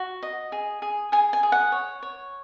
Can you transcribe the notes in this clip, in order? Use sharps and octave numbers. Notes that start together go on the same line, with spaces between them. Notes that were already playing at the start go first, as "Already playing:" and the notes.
Already playing: F#4
D#5
G#4
G#4
G#4 G#5
G#5
G#4
F#5
C#5
C#5